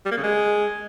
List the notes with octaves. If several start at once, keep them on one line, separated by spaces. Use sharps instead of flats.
G3
A#3
C#3
G#3